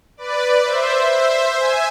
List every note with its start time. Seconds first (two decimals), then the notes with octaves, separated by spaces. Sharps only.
0.17 B4 D5
0.64 C5 E5
1.11 C5 E5
1.59 E5 G#5